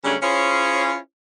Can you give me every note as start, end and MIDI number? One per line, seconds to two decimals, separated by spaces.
0.04 0.15 49
0.04 0.15 54
0.04 0.15 55
0.04 0.15 57
0.04 0.15 61
0.04 0.15 62
0.22 0.97 61
0.22 0.97 64
0.22 0.97 65
0.22 0.97 68
0.22 0.97 72
0.22 0.97 73